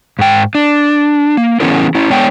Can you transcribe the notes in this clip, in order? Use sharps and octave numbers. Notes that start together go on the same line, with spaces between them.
G#2 G5
D4
A#3
E3 B3 C#4 E4 G#4 A#4
C#4 E4
G#3 B3 D4 C#5 G5